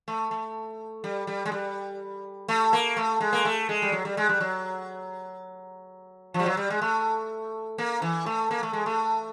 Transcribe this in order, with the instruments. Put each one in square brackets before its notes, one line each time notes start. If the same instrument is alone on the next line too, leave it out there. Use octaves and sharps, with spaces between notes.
[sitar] A3
A3
G3
G3
G#3
G3
A3
A#3
A3
G#3
A#3
A3
G#3
G3
F#3
G3
G#3
G3
F#3
F3
G3
F#3
G3
G#3
A3
A#3
E3
A3
A#3
A3
G#3
A3